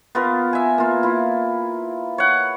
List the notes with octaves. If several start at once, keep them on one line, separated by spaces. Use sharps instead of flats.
B3 F4 A#4
E5 G#5
A#3 F4
E4 F4
C#5 F#5